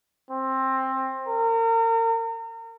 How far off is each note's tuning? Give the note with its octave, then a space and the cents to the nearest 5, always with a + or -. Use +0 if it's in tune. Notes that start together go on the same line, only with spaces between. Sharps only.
C4 +15
A#4 -35